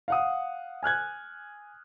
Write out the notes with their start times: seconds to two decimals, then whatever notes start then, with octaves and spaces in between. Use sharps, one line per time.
0.08 F5 F#5 D#6
0.83 G#5 F6 F#6 G#6